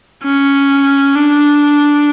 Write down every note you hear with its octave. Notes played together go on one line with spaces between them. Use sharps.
C#4
D4